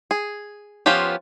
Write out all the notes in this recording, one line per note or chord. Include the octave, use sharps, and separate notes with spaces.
G#4
F3 B3 C#4 F4 G4